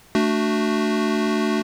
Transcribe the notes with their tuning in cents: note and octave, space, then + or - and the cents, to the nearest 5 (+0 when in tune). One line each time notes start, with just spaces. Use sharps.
A3 +0 D4 +0 F#4 +0